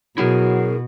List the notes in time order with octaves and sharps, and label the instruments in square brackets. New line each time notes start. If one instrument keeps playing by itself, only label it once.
[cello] B2 [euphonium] F#3 [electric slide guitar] E4 G#4 A#4